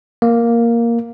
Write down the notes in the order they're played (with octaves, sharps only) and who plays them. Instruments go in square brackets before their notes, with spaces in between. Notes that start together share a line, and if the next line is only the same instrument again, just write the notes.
[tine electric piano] A#3